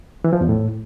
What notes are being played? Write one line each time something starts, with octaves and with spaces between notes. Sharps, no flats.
E3
F3
E2
A2